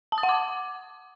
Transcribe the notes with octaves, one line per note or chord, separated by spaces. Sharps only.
A5
D#6
F#5
D6